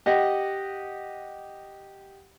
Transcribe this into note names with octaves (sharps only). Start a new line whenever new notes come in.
G4 D#5 F#5